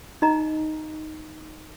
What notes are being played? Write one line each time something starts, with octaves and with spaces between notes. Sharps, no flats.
D#4 D#5 A#5